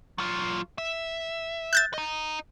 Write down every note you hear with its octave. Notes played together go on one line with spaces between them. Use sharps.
F#3 F4
E5
F#6 G6 A6
D#5 A#5